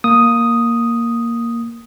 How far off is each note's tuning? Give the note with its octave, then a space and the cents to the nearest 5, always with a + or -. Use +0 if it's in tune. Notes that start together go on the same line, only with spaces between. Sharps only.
A#3 +0 D#6 +0